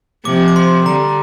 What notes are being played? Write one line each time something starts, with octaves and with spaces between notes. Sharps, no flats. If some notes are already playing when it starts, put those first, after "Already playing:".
C3 F3 D6
D6
C6
D3 G3 A#5